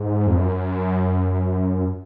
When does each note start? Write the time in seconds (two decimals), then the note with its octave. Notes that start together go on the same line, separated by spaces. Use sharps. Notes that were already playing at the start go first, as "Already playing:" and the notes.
Already playing: G#2
0.27 F2
0.37 F#2